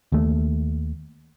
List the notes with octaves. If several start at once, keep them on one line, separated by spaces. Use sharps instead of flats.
D#2 A3